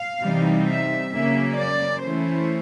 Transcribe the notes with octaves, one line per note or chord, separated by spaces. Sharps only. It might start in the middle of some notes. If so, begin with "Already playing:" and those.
Already playing: F5
C3 E3 G3 C4 D#4
E5
C#3 F#3 A#3 C#4 E5
D5
E3 A3 C#4 E4 C5